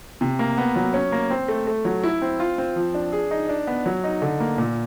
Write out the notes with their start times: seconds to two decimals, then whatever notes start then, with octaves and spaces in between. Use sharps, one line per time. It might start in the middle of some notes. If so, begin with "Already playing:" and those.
0.21 C3
0.39 A#3
0.58 B3
0.76 F#3
0.94 C#4
1.12 A#3
1.30 C4
1.48 A3
1.67 A3
1.85 F#3
2.03 E4
2.22 C4
2.40 F4
2.58 C4
2.76 F3
2.94 D4
3.12 G#4
3.31 D#4
3.49 D4
3.67 B3
3.86 F#3
4.04 D#4
4.22 D3
4.40 A#3
4.58 A#2